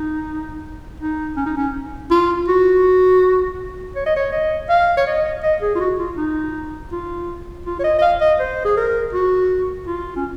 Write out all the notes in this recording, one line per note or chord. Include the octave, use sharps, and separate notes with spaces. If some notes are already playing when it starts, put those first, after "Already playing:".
Already playing: D#4
D#4
C#4
D#4
C#4
F4
F#4
C#5
D#5
C#5
D#5
F5
C#5
D#5
D#5
G#4
F4
F#4
F4
D#4
F4
F4
C#5
D#5
D#5
F5
D#5
C5
G#4
A#4
F#4
F4
C#4